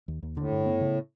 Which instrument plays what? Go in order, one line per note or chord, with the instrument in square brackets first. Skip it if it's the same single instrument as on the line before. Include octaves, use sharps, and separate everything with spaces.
[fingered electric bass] D#2
D#2
[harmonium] A2 [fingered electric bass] D3
[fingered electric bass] G2
B3
C#3